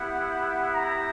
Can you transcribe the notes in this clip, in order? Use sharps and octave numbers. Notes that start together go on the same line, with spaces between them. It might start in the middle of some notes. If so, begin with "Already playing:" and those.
Already playing: B3 E4 G4 F#5
A#5